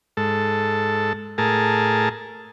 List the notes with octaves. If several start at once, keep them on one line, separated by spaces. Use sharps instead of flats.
G#2 A4
A2 G#4 A#4 A5